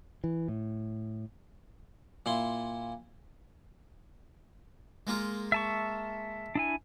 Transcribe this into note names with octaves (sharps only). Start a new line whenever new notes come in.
E3
A2
A#2 E4 C6
G#3 A#3 F4
E5 A5 C#6
D4 E4 G#5